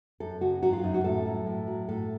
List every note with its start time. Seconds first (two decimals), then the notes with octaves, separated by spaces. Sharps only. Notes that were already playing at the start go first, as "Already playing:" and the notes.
0.20 F#2 A4
0.41 C#3 F#4
0.62 F#3 F#4
0.73 F4
0.84 F#2 D#4
0.94 F#4
1.04 A2 A4
1.26 F#3
1.46 A2
1.67 F#3
1.88 A2 A4